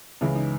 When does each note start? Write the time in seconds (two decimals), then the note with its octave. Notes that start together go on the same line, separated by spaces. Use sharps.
0.21 C#2 C#3 E3 E4
0.35 D#4